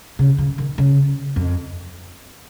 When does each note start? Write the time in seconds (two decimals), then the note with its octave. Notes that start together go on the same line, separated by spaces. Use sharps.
0.19 C#3
0.38 F3
0.58 D#3
0.78 C#3
1.36 F2